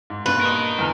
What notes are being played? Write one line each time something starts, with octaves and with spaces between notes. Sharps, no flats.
G#2
G2 A#2 B4
A#4 D#5
E2 D3 F6